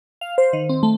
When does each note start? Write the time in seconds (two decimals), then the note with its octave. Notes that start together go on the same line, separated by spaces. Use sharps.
0.21 F5
0.38 C5
0.53 D#3
0.69 C4
0.83 A3